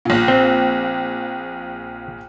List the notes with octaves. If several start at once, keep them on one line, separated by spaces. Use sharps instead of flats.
A#1 A#2
C4